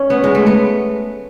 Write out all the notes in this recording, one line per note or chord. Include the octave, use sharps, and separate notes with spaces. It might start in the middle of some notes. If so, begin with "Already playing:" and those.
Already playing: C#4
B3
G#3
A3
B3